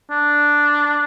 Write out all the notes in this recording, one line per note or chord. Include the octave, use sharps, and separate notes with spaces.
D4